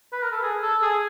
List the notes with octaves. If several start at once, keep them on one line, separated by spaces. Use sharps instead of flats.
B4
A#4
A4
G#4
A4
G#4